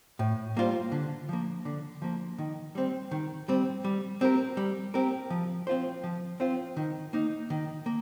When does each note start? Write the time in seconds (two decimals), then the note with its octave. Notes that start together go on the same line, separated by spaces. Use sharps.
0.19 A2
0.57 G3 A#3 F4 C5
0.92 D3
1.29 F3 A#3
1.65 D3
2.02 F3 A#3
2.38 D#3
2.75 G3 C4
3.11 D#3
3.48 G3 C4
3.84 G3
4.21 C4 G4 A#4
4.57 G3
4.94 C4 G4 A#4
5.30 F3
5.67 C4 F4 C5
6.04 F3
6.40 C4 F4 C5
6.77 D#3
7.13 A#3 D#4
7.50 D#3
7.86 A#3